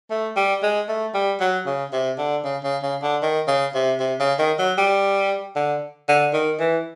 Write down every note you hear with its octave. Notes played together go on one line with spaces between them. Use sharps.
A3
G3
G#3
A3
G3
F#3
C#3
C3
D3
C#3
C#3
C#3
D3
D#3
C#3
C3
C3
C#3
D#3
F#3
G3
D3
D3
D#3
E3